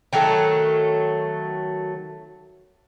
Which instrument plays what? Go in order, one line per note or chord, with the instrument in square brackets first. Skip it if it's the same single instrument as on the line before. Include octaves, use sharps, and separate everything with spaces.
[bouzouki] D#3 F#3 A3 A4